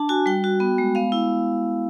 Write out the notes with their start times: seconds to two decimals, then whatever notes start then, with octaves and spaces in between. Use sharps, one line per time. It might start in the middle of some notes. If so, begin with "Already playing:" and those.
Already playing: D4 A5
0.09 F#4 G#5
0.26 G3 G5
0.44 F#4
0.60 B3
0.78 G#3
0.95 B3 F5
1.12 E4